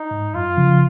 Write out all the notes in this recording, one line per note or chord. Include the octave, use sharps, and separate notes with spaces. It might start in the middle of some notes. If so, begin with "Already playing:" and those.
Already playing: D#4
G#2
F#2 F4
C#3 F3